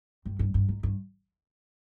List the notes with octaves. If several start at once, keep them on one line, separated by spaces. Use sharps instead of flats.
G2
G2
G2
G#2
G2